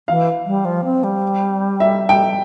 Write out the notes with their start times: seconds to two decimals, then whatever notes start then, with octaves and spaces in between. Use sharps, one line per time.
0.08 E3 F5
0.46 G3
0.65 F3
0.84 C4
1.04 G3
1.80 E5
2.09 G5